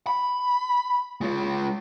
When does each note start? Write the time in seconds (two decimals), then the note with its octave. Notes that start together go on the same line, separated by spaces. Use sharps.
0.07 B5
1.21 G#3 F4